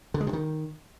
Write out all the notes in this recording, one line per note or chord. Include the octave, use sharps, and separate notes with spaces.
D3
G#3
C3
D#3